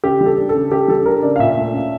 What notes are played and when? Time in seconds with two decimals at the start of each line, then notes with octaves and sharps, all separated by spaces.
0.04 C#3 G4
0.21 G3
0.26 A4
0.38 D4
0.49 A4
0.55 C#3
0.71 C#3 G4
0.88 G3 A4
1.05 D4 A#4
1.23 C#3 D5
1.36 F5
1.39 A#2 E5
1.57 A3
1.74 C#4